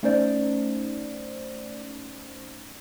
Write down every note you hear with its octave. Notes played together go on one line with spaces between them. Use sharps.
A3 C#4 D#4 C5 D5